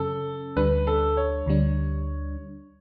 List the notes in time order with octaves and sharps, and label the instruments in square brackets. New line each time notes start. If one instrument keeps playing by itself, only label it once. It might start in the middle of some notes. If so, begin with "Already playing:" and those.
Already playing: [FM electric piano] F#2 C#3 F#3 C#4 [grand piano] A4
[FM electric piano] D2 D3 G3 D4 [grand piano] B4
[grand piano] A4
C#5
[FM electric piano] D2 D3 G3 D4